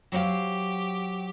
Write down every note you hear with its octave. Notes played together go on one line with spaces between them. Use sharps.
F#3 G4 C5 F5